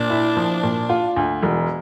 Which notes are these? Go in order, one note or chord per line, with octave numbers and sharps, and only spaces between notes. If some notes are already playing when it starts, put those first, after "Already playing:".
Already playing: A#2 D4
E4
F3
A#2
F4
D2
E1